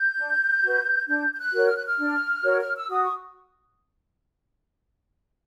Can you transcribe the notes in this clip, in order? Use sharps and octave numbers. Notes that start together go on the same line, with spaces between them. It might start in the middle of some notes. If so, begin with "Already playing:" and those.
Already playing: G6
D4
F#4 B4
D4 G6
G6
F#6
F#4 A#4 C#5
F6
F#6
F6
D4
F#4 A#4 C#5
F6
E6
F#4 D#6
C#6